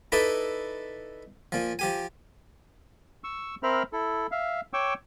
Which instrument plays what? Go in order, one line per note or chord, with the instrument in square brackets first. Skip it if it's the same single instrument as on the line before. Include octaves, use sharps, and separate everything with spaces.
[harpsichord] D#4 E4 A4 B4 D5 E5
A#2 F3
F3 G4 G#5
[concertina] C#6 E6
C4 A#4 C5 E5 B5 F6
E4 A4
E5 F5
C#5 G5 C#6 D6 E6